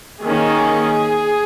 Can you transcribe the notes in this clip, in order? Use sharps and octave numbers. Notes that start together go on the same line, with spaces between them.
D#3 A#3 C#4 G#4